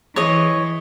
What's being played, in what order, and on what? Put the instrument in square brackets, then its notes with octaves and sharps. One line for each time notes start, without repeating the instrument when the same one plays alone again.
[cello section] E3 [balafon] G#4 [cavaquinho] C#5 D#5